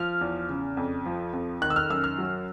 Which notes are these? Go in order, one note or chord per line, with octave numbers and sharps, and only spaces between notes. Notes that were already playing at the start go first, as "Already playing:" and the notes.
Already playing: F3 F6
E2
C#3
F2
F3
F2
D#3 F#6
E6
F6
F#2 E6
F6
F#3